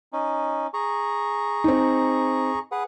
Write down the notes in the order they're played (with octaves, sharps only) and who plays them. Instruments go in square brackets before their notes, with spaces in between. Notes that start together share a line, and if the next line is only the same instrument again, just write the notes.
[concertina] C#4 D#4
G#4 A#5 C#6
[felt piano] C4 D#4
[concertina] G#4 B4 F#5